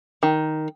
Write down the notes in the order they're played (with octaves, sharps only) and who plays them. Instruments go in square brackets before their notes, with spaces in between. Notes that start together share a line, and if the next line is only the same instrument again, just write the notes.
[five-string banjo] D#3